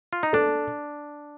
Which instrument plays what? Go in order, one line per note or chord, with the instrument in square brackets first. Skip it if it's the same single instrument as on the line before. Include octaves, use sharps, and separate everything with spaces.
[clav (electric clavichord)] F4
D#4
[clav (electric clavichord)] D4 [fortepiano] A4